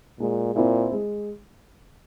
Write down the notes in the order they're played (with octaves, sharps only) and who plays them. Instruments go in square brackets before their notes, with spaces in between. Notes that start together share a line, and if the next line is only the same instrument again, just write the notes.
[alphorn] A#2 [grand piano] G#3
[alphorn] A#2 [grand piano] C4 E4
[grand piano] G#3